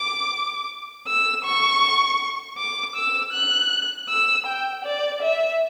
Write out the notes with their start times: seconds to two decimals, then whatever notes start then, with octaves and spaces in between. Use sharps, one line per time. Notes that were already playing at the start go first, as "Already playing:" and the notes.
Already playing: D6
1.08 E6
1.45 C#6
2.57 D6
2.96 E6
3.33 F#6
4.09 E6
4.47 G5
4.85 D5
5.22 E5